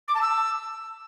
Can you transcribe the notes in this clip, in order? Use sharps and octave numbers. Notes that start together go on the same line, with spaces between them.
D6
A5
E6